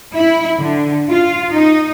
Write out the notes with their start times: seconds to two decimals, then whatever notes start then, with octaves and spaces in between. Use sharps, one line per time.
0.14 E4
0.59 D3
1.09 F4
1.52 D#4